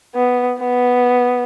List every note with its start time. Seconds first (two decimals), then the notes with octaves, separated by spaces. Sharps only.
0.15 B3
0.60 B3